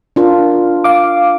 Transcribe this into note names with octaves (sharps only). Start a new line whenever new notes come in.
D4 F4 A#4
F5 D6